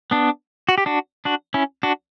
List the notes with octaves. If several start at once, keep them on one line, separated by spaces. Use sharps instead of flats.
B3 D4
F#4
G4
D4 F#4
D4 F#4
C#4 E4
D4 F#4